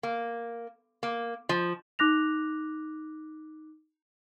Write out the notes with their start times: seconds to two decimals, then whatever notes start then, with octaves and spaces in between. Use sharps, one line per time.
0.03 A#3
1.03 A#3
1.49 F3
1.99 D#4 D6 F#6 A#6 F7